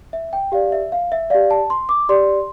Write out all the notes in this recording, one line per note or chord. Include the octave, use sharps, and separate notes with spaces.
E5
G5
G4 D5 F5
E5
F5
E5
G4 D5 F5
A5
C6
D6
G4 D5 C6